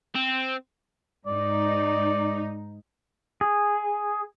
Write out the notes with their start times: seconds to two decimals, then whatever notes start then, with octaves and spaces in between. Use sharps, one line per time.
0.15 C4
1.27 G#2 D#4 D5
3.41 G#4